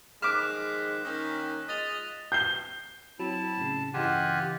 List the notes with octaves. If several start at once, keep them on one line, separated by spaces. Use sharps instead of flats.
D#3 F3 G#3 D6 F6 F#6 B6 E7
D#3 A#3 C#4
G#3 F4 D#5 A6 F7
G6 C7 G7
F#3 C4 E4 A5
A2 C#3
G2 C#3 E3 F4 G4 D#5 F#5 G#5